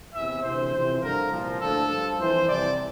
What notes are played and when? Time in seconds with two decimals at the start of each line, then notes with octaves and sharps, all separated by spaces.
0.13 E2 C3 E3 E5
0.42 D2 C3 E3 C5
0.72 F2 C3 E3
1.01 G2 D3 F3 A#4
1.31 C2 A#2 F3
1.60 D2 D3 F3 A4
1.89 G2 F3
2.19 F2 E3 C5
2.48 C2 C3 E3 D5